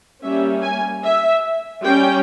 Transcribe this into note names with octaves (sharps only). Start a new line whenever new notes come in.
G3 A#3 C#4 E5
G#5
E5
G3 C#4 G5